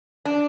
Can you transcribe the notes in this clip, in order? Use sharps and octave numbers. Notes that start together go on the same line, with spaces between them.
D4